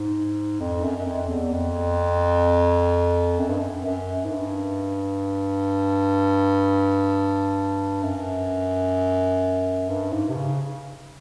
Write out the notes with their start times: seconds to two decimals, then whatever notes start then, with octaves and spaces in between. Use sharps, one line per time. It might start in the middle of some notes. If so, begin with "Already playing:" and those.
Already playing: G#2
0.61 F2
0.84 F#2
0.97 F#2
1.06 F2
1.29 E2
1.53 F2
3.39 F#2
3.49 G2
3.59 F#2
3.85 F#2
4.25 G#2
4.32 G2
8.03 F#2
9.89 G2
10.12 G#2
10.29 C3
10.35 C#3